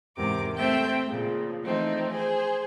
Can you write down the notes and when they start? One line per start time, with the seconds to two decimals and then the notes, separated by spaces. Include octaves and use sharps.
0.16 E2 G#2 C3 A#4 D6
0.55 A3 C4 C5 E5 G5
1.07 A#2 C#3 F3
1.64 E3 F3 A3 C4 D#4
2.12 G#4 C5